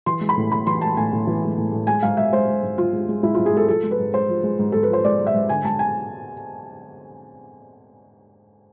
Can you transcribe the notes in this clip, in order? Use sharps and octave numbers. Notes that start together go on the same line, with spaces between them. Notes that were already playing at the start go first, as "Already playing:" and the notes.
E3 C6
G#3
B5
A2
A2 B5
E3 C6
G#3 A5
A2 G#5
A2
E3
G#3
A2
A2
G#3 G#5
G#2 F5
G#2 E5
G#3 C5
G#3
G#2
G#2 F4
G#3
G#3
G#2 E4
G#2 F4
G#4
G#3 A4
F3 A4
G#3
B4
G#2
G#2 C5
F3
G#3
G#2
G#2 A4
B4
F3 C5
G#3 D5
G#2
E5
G#2
D3 G#5
G#3 A5
G#5